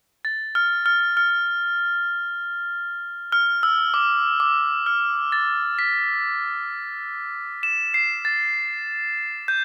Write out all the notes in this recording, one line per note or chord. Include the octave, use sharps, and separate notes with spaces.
A6
F6
F6
F6
F6
E6
D6
D6
F6
A6
B6
E7
C7
A6
G6